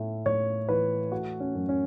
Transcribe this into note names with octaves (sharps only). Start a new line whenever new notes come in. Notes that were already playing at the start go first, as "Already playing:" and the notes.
Already playing: A2 A3
A2 C#5
E3 B4
A3 F#4
C#4
F#2
C#4